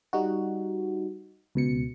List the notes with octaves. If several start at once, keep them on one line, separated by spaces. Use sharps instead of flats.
G3 D#4 F#4
C#2 B2 C#7